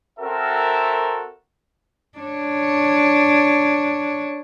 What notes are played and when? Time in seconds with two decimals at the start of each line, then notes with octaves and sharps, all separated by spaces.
0.19 C4 F#4 A4 A#4 E5
2.19 D4 C#5